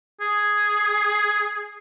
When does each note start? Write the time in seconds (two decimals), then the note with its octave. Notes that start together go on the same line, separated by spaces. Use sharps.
0.21 G#4